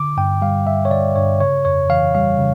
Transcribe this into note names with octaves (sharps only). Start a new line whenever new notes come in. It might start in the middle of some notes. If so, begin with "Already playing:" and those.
Already playing: D3 D6
G2 G5
G3 F5
G2 E5
C#5
D3 D5
G2 C#5
C#3 C#5
F2 C#5
E3 F5
G3 F5
C#3